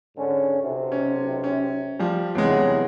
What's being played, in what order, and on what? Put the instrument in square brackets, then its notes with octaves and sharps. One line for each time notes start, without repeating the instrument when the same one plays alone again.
[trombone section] G#2 D3 C#4
B1 C3
[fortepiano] C#4
C#4
F3 G3
[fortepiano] E2 C3 G#3 [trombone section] G2 E3 F#3